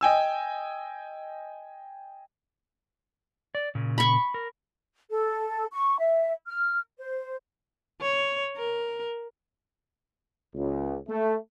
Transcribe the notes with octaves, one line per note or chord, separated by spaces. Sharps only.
D#5 G5 G#5 E6
D5
A#2 C#3
B5 C#6
A#4
A4
C#6
E5
F6
C5
C#5
A#4
C#2
A3